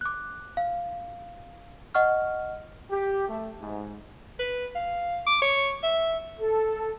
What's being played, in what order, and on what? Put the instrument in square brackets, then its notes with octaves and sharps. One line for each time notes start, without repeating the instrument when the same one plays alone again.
[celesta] D6 F#6
F5
D#5 F#5 C#6 F6
[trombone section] G4
A3
G#2
[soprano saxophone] B4
F5
D6
C#5
E5
[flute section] A4